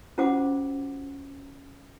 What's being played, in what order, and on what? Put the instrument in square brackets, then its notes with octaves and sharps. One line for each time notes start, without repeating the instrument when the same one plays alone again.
[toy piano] C#4 F4 F#4 C5 F#5 D6